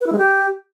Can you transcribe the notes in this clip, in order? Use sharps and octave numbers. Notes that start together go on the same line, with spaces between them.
B4
E4
G#3
G4